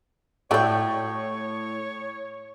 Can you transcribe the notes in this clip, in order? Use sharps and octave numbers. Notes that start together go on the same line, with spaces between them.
A2 A3 F#4 C#5 D5 G5